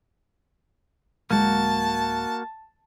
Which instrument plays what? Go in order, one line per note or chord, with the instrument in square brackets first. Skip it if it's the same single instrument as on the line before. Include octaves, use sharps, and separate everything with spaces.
[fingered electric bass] D1 G#3 [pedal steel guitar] A#3 F#4 [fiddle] A5